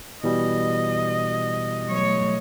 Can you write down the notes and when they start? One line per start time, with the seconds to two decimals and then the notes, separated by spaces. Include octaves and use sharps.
0.24 B2 E3 G3 D#5
1.87 F#3 A3 C#5